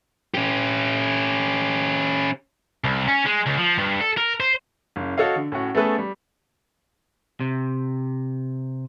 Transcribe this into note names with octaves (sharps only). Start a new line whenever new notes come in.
C#4 G4
C2
C#4
G#3
C#2
F3
G2
A4
A#4
C5
F#1 C#3
F#4 A4 C#5 D#5 F5
D3
A2 C#4 F#4
A3 B3 C#4 G#4 A4 B4
G3
C3